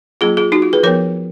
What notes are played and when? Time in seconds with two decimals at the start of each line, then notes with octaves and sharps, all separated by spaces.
0.21 F#3 A#3 C#4 F4 G#4
0.37 F4 G#4
0.52 D#4 F#4
0.62 F4
0.73 G#4 B4
0.83 F3 B3 A#4 C#5